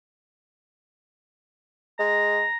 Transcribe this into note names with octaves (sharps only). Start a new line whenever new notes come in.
G#3 A#5